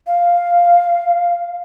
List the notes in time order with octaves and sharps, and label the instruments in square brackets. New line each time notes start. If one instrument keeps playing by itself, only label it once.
[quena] F5